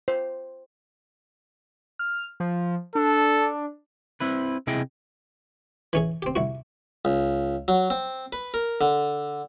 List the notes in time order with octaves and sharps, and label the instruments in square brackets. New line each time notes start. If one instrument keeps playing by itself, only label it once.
[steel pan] C5
[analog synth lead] F6
F3
[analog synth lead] D4 [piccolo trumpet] A4
[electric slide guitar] C4 E4 B4
C3 E4 G#4 D#5 G5
[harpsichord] E3 C#4 G#4
C4 G4
C2 E4 F#4
C#2
F#3
C4
B4
A#4
D3